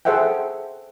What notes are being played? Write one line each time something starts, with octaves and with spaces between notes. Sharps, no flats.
G#4 A4 C5 E5 F#5 G5